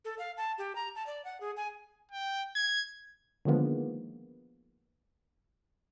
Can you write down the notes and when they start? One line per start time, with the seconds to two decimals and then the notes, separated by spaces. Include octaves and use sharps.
0.05 A4
0.19 F5
0.37 A5
0.58 G4
0.75 A#5
0.95 A5
1.07 D5
1.25 F#5
1.41 G#4
1.57 G#5
2.11 G5
2.55 G#6
3.45 D3 D#3 F3 G#3 A#3 B3